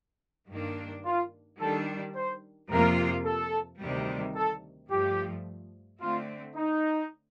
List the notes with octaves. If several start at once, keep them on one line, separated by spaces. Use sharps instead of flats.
G2 D#3 A#3 D4
F4
D#3 G3 D4 A4
C5
F2 C3 F3 A#3 F4 A#4
A4
D2 C3 D#3 G3
A4
G2 F3 A3 G4
D3 A3 C4 F4
D#4